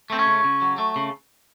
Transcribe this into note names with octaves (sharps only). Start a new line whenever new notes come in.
A3 C4
C#4
C#3
C#3
F#3
A3
C#3